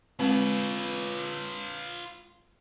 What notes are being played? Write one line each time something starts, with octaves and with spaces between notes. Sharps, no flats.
G#3 C4 F4 B4